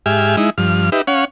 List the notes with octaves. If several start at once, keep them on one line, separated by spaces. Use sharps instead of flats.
G#2 G4 E5 G#5 F6
G#3 D#4 E4
G2 F3 F6
D#4 G4 B4 E5
C#4 C#5 F5 F#5